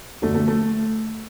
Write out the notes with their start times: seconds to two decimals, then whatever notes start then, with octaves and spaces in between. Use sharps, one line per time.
0.22 F#2 D3 A3
0.35 A3
0.48 A3